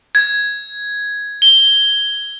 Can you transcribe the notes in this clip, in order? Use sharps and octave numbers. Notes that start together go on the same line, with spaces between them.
G#6
G7